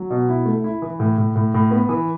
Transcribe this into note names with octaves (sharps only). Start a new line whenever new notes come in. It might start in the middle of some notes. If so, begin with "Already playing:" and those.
Already playing: F#3
B2
E4
A3
E4
E3
A2
A2
A2
A2
B3
E3